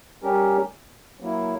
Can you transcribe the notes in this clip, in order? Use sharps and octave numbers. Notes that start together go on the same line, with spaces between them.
G3 C#4 G4 A#4
F#3 A#3 E4